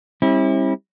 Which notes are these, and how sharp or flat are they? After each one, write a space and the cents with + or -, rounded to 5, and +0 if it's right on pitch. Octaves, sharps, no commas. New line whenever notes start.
G3 +25 C4 +45 E4 -25